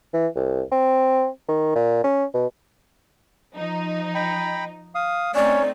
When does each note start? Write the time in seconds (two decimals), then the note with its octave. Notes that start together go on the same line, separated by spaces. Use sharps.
0.14 E3
0.35 C2
0.72 C4
1.48 D#3
1.75 A#2
2.04 C#4
2.34 B2
3.55 F3 D#4
4.15 G5 A#5 B5
4.95 F5 D#6
5.35 A3 C4 C#4 D#4 C#5 D5